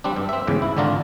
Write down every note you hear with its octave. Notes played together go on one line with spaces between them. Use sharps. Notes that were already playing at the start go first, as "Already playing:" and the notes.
G3 C4 D4
G2
C4 E5
E2 G#2 C#3
E4
G#1 D3 D4 F4 A#5